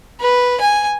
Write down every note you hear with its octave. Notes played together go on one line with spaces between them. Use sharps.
B4
G#5